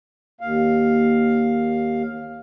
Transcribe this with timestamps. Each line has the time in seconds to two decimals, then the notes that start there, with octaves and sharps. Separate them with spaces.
0.41 D#2 F5